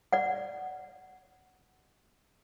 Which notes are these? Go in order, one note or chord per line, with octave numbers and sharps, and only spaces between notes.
D5 F#5